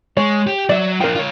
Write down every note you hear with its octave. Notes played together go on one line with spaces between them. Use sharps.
G#3 C#5
G4
F#3 D5 E5
F3 D4 A#4 G5
F4 C#5